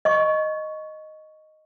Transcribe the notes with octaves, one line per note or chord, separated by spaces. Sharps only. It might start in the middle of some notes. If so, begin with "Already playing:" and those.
D#5 C#6